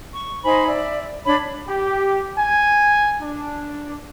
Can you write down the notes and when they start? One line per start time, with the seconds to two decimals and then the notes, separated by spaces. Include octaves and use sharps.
0.13 C#6
0.44 D#4 C5 G#5 B5
0.67 D5 E5
1.26 D4 C#5 B5
1.68 G4
2.38 G#5
3.21 D4